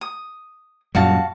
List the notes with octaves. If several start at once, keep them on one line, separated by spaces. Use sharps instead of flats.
D#6
F#2 A#2 G3 F#4 F5 A5